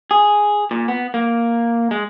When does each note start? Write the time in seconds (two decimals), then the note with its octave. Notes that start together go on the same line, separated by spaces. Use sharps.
0.11 G#4
0.71 A#2
0.88 B3
1.14 A#3
1.91 G#3